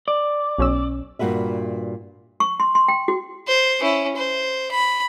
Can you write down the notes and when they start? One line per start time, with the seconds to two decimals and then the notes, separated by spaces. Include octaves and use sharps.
0.08 D5
0.59 B1 C#4 E6
1.19 G2 A#2 F#4 B4 E5
2.40 C#6
2.60 C6
2.75 C6
2.88 G5
3.08 F#4
3.47 C5
3.81 C#4 E4
4.16 C5
4.71 B5